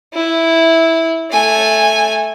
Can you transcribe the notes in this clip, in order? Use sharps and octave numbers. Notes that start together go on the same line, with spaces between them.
E4
A3 G#5